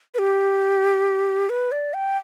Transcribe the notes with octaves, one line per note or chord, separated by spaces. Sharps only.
B4
G4
B4
D5
G5